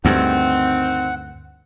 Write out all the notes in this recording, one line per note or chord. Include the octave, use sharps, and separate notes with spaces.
D2 G2 D#3 C4 F#5